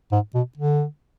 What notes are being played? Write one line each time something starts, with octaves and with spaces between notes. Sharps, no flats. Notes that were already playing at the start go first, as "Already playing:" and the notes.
G#2
B2
D3